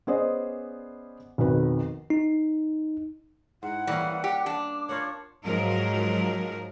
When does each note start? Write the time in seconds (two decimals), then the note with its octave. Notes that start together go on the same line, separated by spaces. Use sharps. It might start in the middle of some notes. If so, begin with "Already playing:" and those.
0.07 B3 C#4 G#4 C5 D5 D#5
1.38 B1 F2 D#3 B4
2.10 D#4
3.63 G#2 E4 F#5
3.87 E3 G3 A#3 C#4
4.24 G4 D6
4.46 D4
4.89 F4 A#4 C#5 F#5
5.43 G#2 F3 F#3 A#4